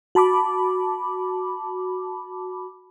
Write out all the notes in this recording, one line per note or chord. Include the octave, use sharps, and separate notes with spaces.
F#4 A5 B5 D6